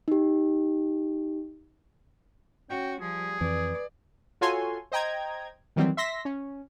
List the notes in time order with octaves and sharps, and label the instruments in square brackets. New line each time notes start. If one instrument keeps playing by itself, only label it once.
[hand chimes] D#4 G4
[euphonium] C#4 [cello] F#4 [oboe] G5
[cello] F3 [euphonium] G3 [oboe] G#4
[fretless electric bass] F2 E3 [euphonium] B4 [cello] D5
[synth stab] F4 F#4 A4 C#5 G#5 C6
C5 D#5 G5 A#5 G#6
D#3 E3 F#3 G3 C4
E5 C6 A#6 B6
C#4